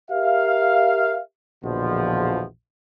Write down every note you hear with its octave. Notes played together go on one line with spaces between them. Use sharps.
G4 A#4 E5 F5
A#1 E2 B2 D3 F3